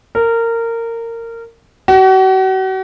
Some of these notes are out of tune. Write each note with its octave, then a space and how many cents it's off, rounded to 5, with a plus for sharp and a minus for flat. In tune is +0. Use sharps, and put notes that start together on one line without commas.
A#4 -20
F#4 +40